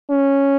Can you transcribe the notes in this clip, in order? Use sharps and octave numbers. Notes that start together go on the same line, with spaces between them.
C#4